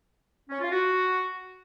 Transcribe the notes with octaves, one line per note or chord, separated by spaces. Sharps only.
C#4
F4
F#4